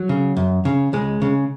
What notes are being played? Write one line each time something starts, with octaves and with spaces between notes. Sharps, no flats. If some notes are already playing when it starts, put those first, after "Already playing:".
Already playing: F#3
C#3
F#2
C#3
C#2 G#3
C#3